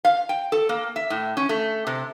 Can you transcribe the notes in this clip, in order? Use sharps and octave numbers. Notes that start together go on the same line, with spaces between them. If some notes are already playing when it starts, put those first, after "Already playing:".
F5
G5
A4
A#3
E5
A2
C#4
A3
C3